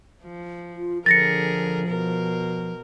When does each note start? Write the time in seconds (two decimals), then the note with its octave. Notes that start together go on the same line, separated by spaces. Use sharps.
0.23 F3
0.75 F4
1.06 D3 F3 G#4 A#4 A6 A#6 C#7
1.88 B2 A#4